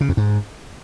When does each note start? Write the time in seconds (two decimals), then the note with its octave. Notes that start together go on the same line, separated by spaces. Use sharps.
0.01 C#3
0.09 F2
0.17 G#2